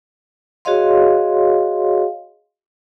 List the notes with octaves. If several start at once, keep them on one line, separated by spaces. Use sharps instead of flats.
F#4 G#4 C#5 D#5 F5 C6